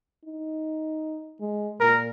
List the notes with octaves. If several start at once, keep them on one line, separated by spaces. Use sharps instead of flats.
D#4
G#3
A#2 A#4